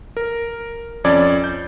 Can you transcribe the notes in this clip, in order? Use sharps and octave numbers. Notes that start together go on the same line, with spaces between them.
A#4
F2 C#4 D5 G#6 A6
G6